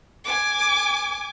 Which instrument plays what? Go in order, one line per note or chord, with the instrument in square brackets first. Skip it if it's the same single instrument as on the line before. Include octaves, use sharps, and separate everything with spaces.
[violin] G#5 D6